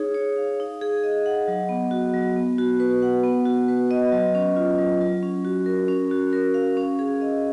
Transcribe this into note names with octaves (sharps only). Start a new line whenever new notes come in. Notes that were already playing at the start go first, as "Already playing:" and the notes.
Already playing: D#4 G#4 C#5
C#5
F5
D#4
G#4
D#5
F#5
F#3
B3
F#4
F#3
B3
F#4
B4
F#5
B3
F#4
B4
D#5
F#3
C#4
F4
F#3
F#3
C#4
F#4
A#4
C#4
F#4
A#4
F5
C#4
G#4
D#5